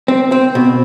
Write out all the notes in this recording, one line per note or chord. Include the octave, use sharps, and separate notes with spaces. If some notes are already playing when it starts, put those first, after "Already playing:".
C4
C4
B2